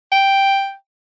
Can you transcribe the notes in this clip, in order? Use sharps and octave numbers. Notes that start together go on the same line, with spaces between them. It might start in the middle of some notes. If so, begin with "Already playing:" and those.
G5